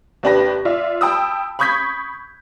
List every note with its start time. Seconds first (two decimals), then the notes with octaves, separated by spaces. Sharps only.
0.23 D#2 C3 D4 G4 B4 A#6
0.65 F4 D5 E5
1.01 G5 A5 B5 D#6 E6
1.59 B5 C#6 D#6 G6 G#6 B6